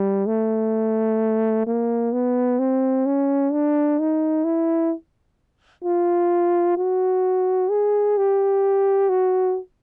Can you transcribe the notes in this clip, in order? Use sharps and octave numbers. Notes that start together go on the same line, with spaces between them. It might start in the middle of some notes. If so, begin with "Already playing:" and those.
Already playing: G3
A3
A#3
B3
C4
C#4
D4
D#4
E4
F4
F#4
G#4
G4
F#4